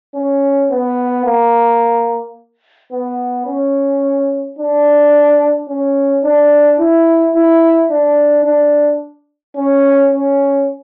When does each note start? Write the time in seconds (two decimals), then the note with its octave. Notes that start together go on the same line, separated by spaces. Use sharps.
0.15 C#4
0.71 B3
1.26 A#3
2.92 B3
3.47 C#4
4.59 D4
5.69 C#4
6.24 D4
6.79 E4
7.35 E4
7.91 D4
8.45 D4
9.57 C#4
10.13 C#4